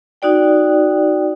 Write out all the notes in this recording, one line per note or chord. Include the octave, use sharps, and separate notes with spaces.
D#4 F#4 D5 G5